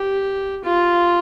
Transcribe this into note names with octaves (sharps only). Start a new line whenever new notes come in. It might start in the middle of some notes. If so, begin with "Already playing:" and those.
Already playing: G4
F4